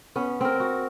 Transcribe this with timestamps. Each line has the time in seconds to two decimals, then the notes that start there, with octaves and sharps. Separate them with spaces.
0.16 B3 C#4
0.41 C4 A#4
0.60 F#4